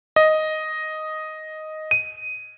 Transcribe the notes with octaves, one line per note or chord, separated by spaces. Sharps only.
D#5
D#7